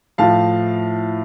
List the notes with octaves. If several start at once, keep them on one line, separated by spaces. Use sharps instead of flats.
A2 F3 F5 A5